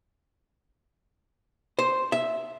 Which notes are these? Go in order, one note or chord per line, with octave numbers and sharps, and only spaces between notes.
C5
E5